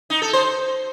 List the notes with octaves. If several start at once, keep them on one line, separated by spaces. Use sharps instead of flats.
D#4
A4
C5